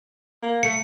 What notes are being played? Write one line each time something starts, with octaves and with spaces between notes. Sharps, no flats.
A#3
A3 C#7